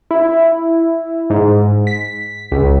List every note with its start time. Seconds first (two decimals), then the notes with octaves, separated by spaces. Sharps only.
0.11 E4
1.30 G#2
1.87 B6
2.52 C#2